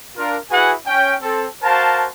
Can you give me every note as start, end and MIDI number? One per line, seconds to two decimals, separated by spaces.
0.18 0.38 62
0.18 0.38 65
0.18 0.38 70
0.51 0.73 64
0.51 0.73 66
0.51 0.73 68
0.51 0.73 71
0.51 0.73 78
0.51 0.73 80
0.87 1.14 61
0.87 1.14 79
1.22 1.47 60
1.22 1.47 69
1.63 2.07 66
1.63 2.07 70
1.63 2.07 72
1.63 2.07 77
1.63 2.07 81